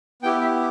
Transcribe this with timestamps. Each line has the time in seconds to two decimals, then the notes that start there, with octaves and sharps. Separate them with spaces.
0.22 B3 E4 G4 G5
0.41 E5